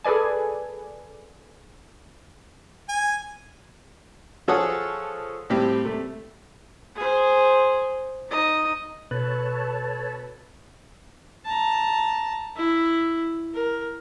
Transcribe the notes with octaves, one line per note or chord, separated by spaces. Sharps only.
G#4 A4 B4 D5 G#5
G#5
F3 G#4 A4 C#5 F#5 D#6
A2 G3 C4 G4
C3 A3
G#4 C5
D#4 D#5
B2 A4 B4 C#5 A5
A5 A#5
E4
A#4